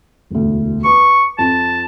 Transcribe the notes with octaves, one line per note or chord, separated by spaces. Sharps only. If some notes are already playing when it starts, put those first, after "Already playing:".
E1 D2
B4 C#6 D6
F2 A5